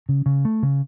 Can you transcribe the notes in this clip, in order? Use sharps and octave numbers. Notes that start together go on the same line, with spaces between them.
C#3
C#3
A3
C#3